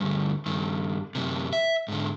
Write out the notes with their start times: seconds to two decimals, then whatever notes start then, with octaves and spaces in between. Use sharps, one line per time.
0.01 D2 G2
0.46 G2 D#3
1.15 F#2 C3
1.53 E5
1.88 G#2 D3